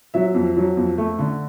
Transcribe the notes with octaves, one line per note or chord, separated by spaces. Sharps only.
F#3 E5
F2
F#3
F2
A3
D3